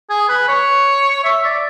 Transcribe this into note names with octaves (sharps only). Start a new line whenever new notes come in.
G#4
B4
C#5
E5
D5